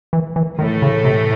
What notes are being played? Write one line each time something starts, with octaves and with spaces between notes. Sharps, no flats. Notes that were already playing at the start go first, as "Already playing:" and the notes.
E3
E3
A2 D#3 E3 A3
C#3
C3